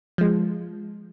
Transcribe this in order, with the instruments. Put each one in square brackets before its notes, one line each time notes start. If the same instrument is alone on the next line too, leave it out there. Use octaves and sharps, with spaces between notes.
[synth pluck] F3 G#3